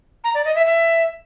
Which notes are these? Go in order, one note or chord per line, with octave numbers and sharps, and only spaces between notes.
A#5
D5
D#5
E5
E5